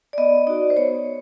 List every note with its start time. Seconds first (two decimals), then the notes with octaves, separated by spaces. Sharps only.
0.13 D5
0.18 B3 D#5
0.47 D#4 F#4 D5
0.70 C5
0.77 B3 C#5